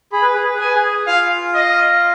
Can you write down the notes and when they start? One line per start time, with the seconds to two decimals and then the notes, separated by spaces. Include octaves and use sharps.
0.12 G#4 B5
0.22 B4
0.34 G#4
0.44 B4
0.54 G#4
0.59 B4 G#5
0.75 G#4
1.07 F4 F5
1.54 D#5